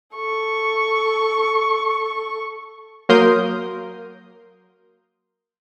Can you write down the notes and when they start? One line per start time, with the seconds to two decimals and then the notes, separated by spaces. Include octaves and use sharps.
0.16 A4 C#6
3.09 F#3 A#3 A#4 C6 D#6 G6